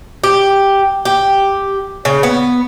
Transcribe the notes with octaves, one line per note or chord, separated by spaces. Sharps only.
G4
G4
C#3
B3